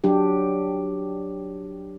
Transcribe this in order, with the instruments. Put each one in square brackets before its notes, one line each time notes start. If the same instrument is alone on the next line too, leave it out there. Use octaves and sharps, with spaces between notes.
[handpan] F#3 D4 G4